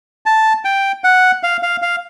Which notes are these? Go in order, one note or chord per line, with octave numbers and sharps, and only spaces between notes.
A5
G5
F#5
F5
F5
F5